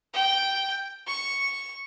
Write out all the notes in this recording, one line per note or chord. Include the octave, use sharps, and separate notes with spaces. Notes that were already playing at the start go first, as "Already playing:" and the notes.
G5
C#6